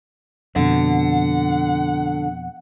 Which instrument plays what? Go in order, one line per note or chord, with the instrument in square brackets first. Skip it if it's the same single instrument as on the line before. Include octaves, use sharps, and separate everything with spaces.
[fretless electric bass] F2 B2 [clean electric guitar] D3 [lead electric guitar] F#5